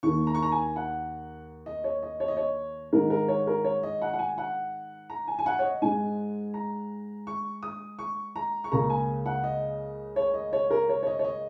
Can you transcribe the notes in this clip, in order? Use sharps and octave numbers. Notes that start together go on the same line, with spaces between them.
D#2 D#3 A#3 C#6
A#5
C#6
A#5
G#5
F#5
D#5
C#5
D#5
C#5
D#5
C#5
G#2 D#3 G#3 A#4
A#4
C#5
A#4
C#5
D#5
F#5
F#5
G#5
F#5
A#5
G#5
G#5
F#5
C#5
D#5
G#2 G#3 G#5
A#5
C#6
D#6
C#6
A#5
C#6
C#2 C#3 A#3 A#5
G#5
F#5
D#5
C#5
D#5
C#5
A#4
C#5
C#5
D#5
C#5
D#5